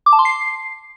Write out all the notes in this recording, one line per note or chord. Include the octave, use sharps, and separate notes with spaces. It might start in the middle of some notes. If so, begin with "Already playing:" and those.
D6
A5
C6
C7